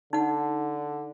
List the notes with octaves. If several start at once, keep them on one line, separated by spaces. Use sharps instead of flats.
D3 D#4 F#5